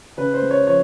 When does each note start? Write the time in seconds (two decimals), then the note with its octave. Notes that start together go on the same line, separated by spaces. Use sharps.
0.17 C#3 B4
0.34 C5
0.42 G#3
0.51 C#5
0.67 F3 C#5